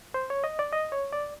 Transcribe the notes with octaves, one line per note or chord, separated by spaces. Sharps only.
C5
C#5
D#5
D5
D#5
C#5
D5